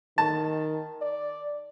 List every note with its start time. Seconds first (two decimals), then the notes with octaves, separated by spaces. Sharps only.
0.18 D#3 A5
1.02 D5